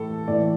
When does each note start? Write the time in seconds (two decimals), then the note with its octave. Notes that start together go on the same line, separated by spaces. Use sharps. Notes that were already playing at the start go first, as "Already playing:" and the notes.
Already playing: A2 E3 A4
0.28 A2 E3 D5